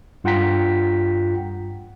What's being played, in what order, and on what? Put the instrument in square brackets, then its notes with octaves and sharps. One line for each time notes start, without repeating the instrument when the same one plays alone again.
[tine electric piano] G2 F4 F#5 G5 A#5 B6